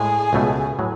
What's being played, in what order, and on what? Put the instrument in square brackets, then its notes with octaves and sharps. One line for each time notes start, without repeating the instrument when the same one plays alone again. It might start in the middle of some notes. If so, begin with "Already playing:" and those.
Already playing: [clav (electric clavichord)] A2 G#3 [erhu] G#4
[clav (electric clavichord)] C#2 B2 A3
A2 F#3